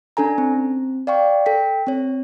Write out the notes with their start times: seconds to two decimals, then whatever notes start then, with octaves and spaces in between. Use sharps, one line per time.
0.17 C#4 D4 A4 G#5 A#5
0.38 C4
1.07 D5 F5 G5 C#6
1.46 A4 G5 B6
1.87 C4 C#5